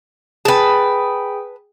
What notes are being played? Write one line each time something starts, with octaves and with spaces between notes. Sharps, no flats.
G#4 B4 G5 A5